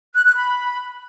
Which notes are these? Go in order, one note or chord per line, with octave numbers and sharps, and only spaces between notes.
F#6
F#6
B5